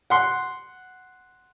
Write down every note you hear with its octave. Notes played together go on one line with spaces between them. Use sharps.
F#5 C6